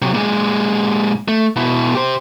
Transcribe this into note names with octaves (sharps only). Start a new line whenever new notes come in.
C3 F#3
A#2 G#3
A3
B2 E4
G4 C5